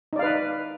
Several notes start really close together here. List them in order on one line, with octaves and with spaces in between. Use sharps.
D#4 D5 F5 B4